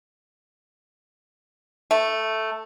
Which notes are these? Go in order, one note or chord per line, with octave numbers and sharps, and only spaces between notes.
A3